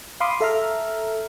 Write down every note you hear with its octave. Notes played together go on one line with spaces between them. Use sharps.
F5 B5 C6 D6 D#6
A4 E5 A#5 F6